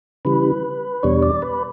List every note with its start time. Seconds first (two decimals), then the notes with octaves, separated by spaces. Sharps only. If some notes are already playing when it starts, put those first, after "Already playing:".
0.25 C#3 E3 G3 B4
1.03 E2 B2 G3 D4 C#5
1.23 D5
1.42 B4